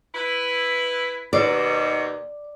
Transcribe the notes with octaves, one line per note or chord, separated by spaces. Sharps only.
E4 B4
D#2 B2 D5